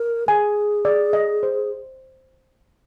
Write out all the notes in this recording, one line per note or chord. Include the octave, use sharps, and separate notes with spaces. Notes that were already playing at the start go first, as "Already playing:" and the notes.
Already playing: A#4
G#4 G#5
D5
D#5
C5